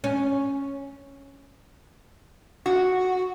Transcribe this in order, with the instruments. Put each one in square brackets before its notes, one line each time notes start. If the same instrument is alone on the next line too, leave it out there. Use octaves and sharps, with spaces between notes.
[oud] C#4
[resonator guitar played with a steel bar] F#4